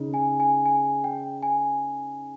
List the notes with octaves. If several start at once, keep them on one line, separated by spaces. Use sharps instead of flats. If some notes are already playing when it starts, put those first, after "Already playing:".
Already playing: C#3 D#4
G#5
G#5
G#5
G5
G#5